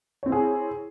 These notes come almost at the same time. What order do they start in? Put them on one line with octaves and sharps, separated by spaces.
C#5 C4 E4 G#4